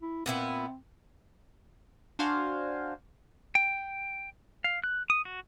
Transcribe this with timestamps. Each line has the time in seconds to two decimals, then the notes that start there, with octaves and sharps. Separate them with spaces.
0.02 E4
0.26 A#2 B3 C4 E4
2.19 D4 F#4 C5 F5 G#5
3.55 G5
4.64 F5
4.84 F#6
5.10 D#6
5.25 F#4